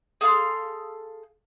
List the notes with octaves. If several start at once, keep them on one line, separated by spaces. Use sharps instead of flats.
G#4 A4 F5 C6